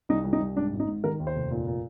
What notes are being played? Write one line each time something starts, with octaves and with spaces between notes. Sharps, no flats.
C2 D#4
C2
D#4
C2
G#2 D4
G#1
D#4
G#2
D#3 A#4
D#2
C5
F1
A#2
A#2